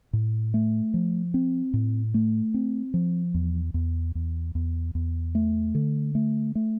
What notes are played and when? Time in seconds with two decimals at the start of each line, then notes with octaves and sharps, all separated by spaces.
0.13 A2
0.54 A3
0.94 F3
1.34 C4
1.74 A2
2.14 A3
2.54 C4
2.94 F3
3.34 E2
3.74 E2
4.15 E2
4.55 E2
4.95 E2
5.35 A3
5.75 D3
6.15 A3
6.55 A3